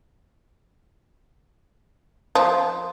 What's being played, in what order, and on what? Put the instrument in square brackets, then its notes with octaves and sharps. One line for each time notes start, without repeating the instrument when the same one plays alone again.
[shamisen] F3